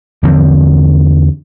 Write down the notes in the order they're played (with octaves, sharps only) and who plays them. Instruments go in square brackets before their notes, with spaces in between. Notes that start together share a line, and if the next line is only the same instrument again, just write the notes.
[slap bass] E2 D3 F3 C4